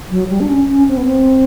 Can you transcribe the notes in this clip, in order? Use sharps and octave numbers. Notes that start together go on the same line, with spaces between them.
F#3
G3
D4
C#4
C#4
C4
B3
C4